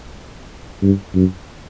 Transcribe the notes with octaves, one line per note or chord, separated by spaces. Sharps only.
G2
F#2